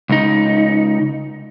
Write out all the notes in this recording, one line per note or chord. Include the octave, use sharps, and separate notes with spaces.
C#2 D#4